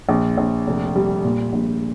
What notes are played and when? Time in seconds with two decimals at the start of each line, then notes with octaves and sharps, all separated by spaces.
0.09 A#1
0.38 A#1
0.67 F1
0.96 G3
1.24 A#2
1.53 A#1